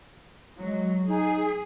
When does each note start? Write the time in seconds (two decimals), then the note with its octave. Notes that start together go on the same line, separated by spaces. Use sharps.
0.59 F#3 G#3
1.09 D#4 G#4